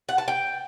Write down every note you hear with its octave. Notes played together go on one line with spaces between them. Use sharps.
F#5
A5
G5